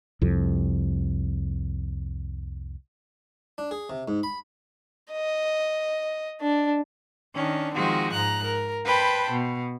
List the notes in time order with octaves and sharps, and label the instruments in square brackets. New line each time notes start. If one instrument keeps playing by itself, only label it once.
[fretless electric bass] C2 F2
[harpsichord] D4
G#4
C3
G#2
B5
[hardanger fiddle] D#5
D4
[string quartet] D#3 C#4 D4
D#3 F3 G#3 C4 F#4
G#2 A#5 F#6
A#4
B4 C5 G5 A5 B5
B2